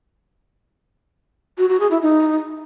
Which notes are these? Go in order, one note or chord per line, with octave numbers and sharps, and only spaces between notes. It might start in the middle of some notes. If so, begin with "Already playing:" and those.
F#4
F#4
G#4
E4
D#4